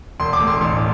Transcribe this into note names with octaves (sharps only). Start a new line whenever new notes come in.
E1 C6
D6
D2
C6
A1 C6